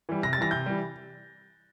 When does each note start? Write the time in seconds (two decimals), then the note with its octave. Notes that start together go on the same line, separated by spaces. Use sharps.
0.09 E3 G3
0.23 C3 A#6
0.33 A6
0.38 E3 G3 A#6
0.51 C3 G6
0.66 E3 G3